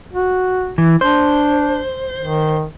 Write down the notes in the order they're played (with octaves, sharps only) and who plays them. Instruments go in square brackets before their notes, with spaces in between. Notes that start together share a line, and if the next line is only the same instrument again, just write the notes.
[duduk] F#4
[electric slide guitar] E3
[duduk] D4 [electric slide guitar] C5
[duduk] D#3